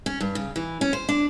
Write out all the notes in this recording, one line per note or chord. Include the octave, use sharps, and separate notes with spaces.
C#4
G2
C#3
E3
C#4
C5
D4